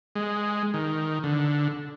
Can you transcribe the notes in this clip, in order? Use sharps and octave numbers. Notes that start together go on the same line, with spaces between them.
G#3
D#3
D3